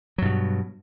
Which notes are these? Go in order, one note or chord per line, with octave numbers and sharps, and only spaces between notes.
G2 B2 F#3